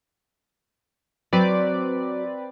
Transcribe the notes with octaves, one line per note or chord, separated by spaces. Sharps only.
F#3 C4 B4 D5